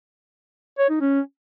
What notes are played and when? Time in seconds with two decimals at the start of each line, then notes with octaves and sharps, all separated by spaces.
0.79 C#5
0.90 D#4
1.01 C#4